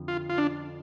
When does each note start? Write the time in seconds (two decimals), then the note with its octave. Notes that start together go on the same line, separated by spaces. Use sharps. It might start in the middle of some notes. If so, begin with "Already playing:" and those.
Already playing: F2 D3 F3
0.08 F4
0.29 F4
0.38 D4